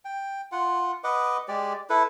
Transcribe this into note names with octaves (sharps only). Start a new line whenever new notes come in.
G5
F4 F#5
B4 D#5 F#5 D6
G#3 G4 D5
E4 A4 B4